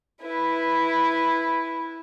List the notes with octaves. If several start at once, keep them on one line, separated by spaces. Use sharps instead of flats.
E4 B4